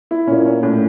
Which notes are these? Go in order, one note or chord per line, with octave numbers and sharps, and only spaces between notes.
E4
A#2 C#4
C#4
A2